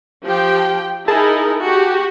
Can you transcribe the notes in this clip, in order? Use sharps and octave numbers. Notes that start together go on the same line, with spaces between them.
F3 G4 G5
D#4 E4 G#4 A#4 A5
F#4 G4